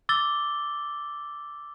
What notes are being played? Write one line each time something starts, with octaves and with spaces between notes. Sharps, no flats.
D6 E6 A6 G7